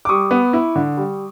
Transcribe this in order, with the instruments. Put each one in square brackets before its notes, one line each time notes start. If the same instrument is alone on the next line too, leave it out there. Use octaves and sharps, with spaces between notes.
[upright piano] D6
G3 C#6 D#6
B3
E4
D3
G3